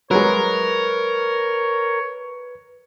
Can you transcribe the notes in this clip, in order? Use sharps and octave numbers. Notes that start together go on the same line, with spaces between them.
F#3 G#3 A#4 B4 C#5